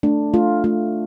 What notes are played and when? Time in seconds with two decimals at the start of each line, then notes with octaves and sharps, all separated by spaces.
0.03 A3 D4
0.33 A3 F4
0.64 A3 F4